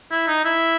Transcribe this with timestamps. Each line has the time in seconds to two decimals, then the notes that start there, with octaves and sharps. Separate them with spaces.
0.11 E4
0.27 D#4
0.45 E4